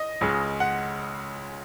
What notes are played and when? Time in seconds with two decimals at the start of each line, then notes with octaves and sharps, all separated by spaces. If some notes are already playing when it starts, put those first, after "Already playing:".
Already playing: D#5
0.21 C#2 C#3 G#3
0.60 F#5